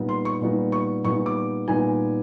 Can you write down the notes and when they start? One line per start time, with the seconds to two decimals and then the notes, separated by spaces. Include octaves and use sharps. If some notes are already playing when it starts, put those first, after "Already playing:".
Already playing: A#2 G3 B3 D#4
0.09 C6
0.25 C#6
0.41 A#2 G3 B3 D#4
0.72 C#6
1.05 A#2 G3 B3 D#4 C#6
1.26 D6
1.68 A#2 G3 B3 D#4 G#5